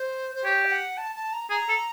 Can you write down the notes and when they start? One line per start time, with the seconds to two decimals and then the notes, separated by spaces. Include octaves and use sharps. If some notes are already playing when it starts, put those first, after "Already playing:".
Already playing: C5
0.35 C5
0.44 G4 C#5
0.65 G5
0.71 F#5
0.97 A5
1.15 A5
1.33 A#5
1.50 G#4 A#5
1.69 A4